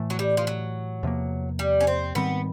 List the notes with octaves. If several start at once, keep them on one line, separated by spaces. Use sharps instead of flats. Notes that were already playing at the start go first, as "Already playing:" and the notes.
Already playing: A2 E3 A3
F#3
G3
F3
F#3
E2 C3 F3 A#3
G3
C#4
C4
G#2 D#3 G3 B3 C4